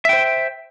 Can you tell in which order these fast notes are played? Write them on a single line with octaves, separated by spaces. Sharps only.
E5 G5 C5